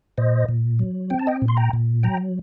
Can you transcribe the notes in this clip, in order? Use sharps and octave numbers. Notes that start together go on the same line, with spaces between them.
A#2 C5 D#5
A#2
F#3
C4 G5
A5
D#5 G5
A#2
C6
G5 A#5
A#2
F#3 G5 A#5